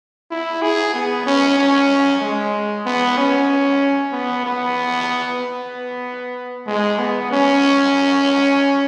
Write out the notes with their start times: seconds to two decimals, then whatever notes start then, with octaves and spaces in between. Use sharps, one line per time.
0.31 E4
0.62 G#4
0.94 B3
1.26 C#4
1.58 C#4
2.22 G#3
2.85 B3
3.17 C#4
4.12 B3
4.44 B3
5.40 B3
6.67 G#3
6.99 B3
7.31 C#4